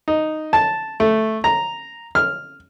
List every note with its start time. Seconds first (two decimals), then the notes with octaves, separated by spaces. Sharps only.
0.08 D#4
0.53 A5
1.00 A3
1.44 A#5
2.15 F6